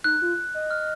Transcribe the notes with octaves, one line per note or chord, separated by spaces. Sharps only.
D#4 F#6
F4
D#5
F6